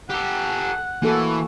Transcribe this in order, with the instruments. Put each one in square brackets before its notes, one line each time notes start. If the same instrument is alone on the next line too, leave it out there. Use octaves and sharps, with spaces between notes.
[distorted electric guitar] G4 A4 [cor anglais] F#5
[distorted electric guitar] E3 [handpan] A#3 F#4 A4